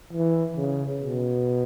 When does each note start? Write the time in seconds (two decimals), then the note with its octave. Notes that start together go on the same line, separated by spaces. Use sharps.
0.13 E3
0.56 C#3
1.01 B2